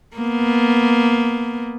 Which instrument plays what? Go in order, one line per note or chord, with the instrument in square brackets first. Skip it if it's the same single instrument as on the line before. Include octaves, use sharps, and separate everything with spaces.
[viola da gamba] A#3 B3